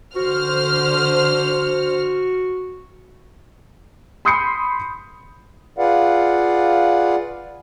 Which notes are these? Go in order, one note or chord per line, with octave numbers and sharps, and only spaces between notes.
D3 F#4 C5 F6
B5 C6 D#6 G6 C7 C#7
F4 G#4 B4 D5 F5 F#5